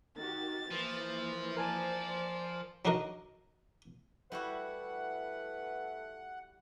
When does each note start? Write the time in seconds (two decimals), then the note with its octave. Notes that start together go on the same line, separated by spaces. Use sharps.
0.17 D#3 F#4 G4 A6
0.71 E3 F3 A#3
1.57 A#4 C5 D5 G#5 A5
2.85 F#3 D4 D#4 F#4 A#4 D#5
4.32 G3 A3 E4 F#4 B4 F#5